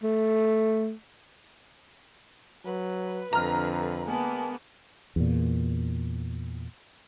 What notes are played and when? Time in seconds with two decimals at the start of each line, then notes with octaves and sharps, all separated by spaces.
0.03 A3
2.65 F#3 B4
3.33 F2 D3 A#5 F6
4.05 G#3 A#3 B3 A5
5.16 E2 A#2